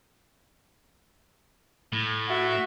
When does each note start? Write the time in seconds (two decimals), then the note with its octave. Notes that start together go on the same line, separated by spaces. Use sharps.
1.93 A2
2.29 F#4 E5